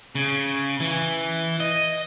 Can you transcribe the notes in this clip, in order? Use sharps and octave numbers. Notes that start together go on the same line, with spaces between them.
C#3
E3
D#5